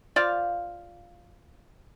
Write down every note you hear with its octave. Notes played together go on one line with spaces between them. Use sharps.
F4 C5 D5 F5